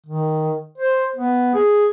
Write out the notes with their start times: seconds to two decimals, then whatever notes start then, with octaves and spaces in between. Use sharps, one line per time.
0.06 D#3
0.78 C5
1.16 B3
1.55 G#4